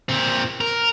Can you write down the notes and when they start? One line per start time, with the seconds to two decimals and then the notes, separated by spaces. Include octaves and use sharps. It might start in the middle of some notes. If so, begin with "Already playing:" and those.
0.09 A#2 C4
0.61 A#4